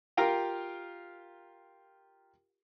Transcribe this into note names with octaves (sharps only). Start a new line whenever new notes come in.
F4 G4 A#4 F5 G5 A#5